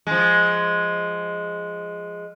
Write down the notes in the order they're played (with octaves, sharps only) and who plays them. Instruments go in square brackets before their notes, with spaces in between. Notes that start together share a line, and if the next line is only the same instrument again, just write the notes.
[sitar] F3 G#3